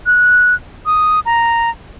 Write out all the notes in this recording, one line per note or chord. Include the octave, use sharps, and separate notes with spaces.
F#6
D#6
A#5